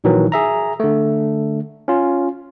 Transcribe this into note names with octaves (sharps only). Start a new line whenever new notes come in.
A#1 A#2 D#3 E3 F#3
G#4 E5 A#5
D3 A3
C#4 F4